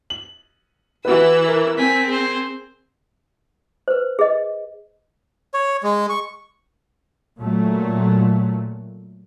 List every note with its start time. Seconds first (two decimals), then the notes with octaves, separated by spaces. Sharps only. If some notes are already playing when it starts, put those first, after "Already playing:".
0.10 F#7
1.05 E3 F#4 G4 B4 E6
1.48 A#4
1.78 C4 G#5 B6
2.07 G#4 C5
3.88 B4 C5
4.19 G#4 D#5
5.54 C#5
5.83 G#3
6.09 C#6
7.39 A#2 F#3 A3